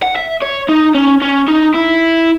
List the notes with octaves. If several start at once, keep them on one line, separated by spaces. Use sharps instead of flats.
F#5
E5
C#5
D#4
C#4
C#4
D#4
E4